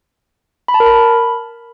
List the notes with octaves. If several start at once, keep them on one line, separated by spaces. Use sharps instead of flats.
B5
A5
A#4
B5